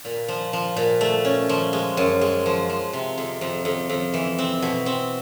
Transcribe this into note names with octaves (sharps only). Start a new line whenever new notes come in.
A#2
F3
F3
A#2
A3
C#4
F3
G#3
F#2
G#3
F3
F3
C3
F2
F2
F2
F2
E3
C4
B2
C4